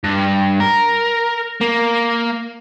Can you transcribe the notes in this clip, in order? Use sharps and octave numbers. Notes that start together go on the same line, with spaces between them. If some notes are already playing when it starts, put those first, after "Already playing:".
G2
A#4
A#3